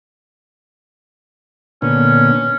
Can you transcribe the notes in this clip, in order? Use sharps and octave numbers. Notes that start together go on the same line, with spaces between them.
A#2 D3 B3 C#4